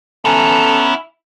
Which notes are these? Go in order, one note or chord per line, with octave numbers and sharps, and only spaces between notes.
B3 C#4 E4 A4 G#5 A#5